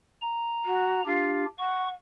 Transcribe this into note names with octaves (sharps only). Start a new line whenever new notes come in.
A#5
F#4
D4 F4 G4
F#5 C#6